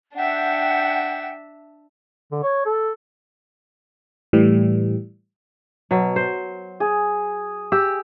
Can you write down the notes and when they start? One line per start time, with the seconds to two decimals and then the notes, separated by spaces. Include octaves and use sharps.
0.15 D4 E5 F#5 G5
2.32 D3
2.43 C#5
2.66 A4
4.33 A2 E3 G3
5.91 B2 F#3
6.16 C5
6.80 G#4
7.72 G4 E6